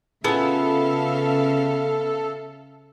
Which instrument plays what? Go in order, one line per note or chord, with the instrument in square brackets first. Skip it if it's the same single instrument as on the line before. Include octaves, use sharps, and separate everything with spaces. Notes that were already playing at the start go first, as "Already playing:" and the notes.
[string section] C#3 E5 F5 [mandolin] B3 [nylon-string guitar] F4 G#4 [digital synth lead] A4